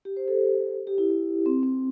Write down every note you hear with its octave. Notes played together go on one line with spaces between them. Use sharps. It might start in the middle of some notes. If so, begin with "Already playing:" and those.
G4
C5
A4
G4
E4
E4
C4
C4